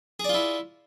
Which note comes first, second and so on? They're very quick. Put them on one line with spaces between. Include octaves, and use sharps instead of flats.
G#4 D5 F4 E4